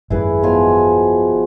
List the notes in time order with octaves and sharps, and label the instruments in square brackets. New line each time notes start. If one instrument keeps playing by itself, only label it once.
[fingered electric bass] G#1 F#2 G3 [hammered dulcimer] E4 G#4 B4
[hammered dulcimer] B2 F3 G#5